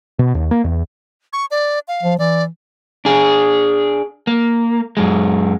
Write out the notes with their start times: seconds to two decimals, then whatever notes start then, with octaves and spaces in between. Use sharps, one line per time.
0.19 B2
0.35 D#2
0.51 A#3
0.64 E2
1.33 C#6
1.51 D5
1.88 F5
2.03 F3
2.19 E3 D5
3.05 D4 G#4
4.27 A#3
4.97 F#2 G#3